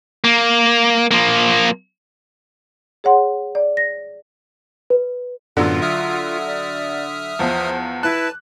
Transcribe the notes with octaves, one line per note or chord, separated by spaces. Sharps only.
A#3
F3 A#3
G#4 C#5 F#5 C6
D5
A#6
B4
F#2 A2 D3 F#3 B3 F4
E5 D#6 F6
D5
E2 F3 C5
E4 B4 A5 F#6